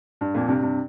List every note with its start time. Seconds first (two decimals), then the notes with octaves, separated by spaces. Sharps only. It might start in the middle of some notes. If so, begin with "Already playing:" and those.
0.21 G2
0.34 F2 A#2
0.48 G2 C3
0.62 G2 C3